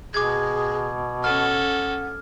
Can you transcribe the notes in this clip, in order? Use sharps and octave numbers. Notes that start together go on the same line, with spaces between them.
B2 G#4 D6 G#6
C#4 A4 F#5 F6